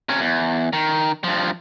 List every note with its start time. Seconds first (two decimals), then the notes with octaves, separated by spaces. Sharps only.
0.09 C3 C#4
0.21 E2
0.73 D#3
1.24 G2 F3